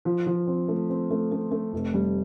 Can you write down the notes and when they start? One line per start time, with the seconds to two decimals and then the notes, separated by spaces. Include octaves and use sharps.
0.05 F3
0.26 F3
0.47 C4
0.68 A3
0.90 C4
1.11 A3
1.32 A3
1.51 A3
1.73 F1
1.94 G3